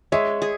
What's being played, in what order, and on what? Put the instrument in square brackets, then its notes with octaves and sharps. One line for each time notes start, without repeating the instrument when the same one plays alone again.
[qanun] G#3 [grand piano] C#5 E5
[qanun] G#4